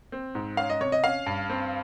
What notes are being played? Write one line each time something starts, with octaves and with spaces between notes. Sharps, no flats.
C4
G#2
C#4 F5
D#5
C3 C#5
D#5
C#4 F5
G2
C4